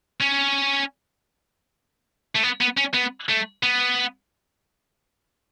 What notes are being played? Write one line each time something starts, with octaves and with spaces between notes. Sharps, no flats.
C#4
A3
B3
B3
C#4
B3
A3
B3